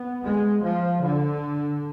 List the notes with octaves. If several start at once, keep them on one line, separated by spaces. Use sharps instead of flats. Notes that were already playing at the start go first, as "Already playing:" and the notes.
Already playing: B3
G#3
F3
D3